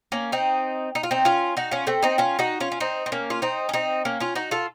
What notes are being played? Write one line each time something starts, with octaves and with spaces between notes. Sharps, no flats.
A#3 C#4
C4 D#4
D#4
F4
C4 D#4
C#4 F4
D#4 F#4
C#4 F4
A3 C4
C4 D#4
C#4 F4
D#4 F#4
C#4 F4
C#4
C4 D#4
C4
A#3 C#4
F4
C4 D#4
C#4
C4 D#4
A#3 C#4
C#4 F4
D#4 F#4
F4 A4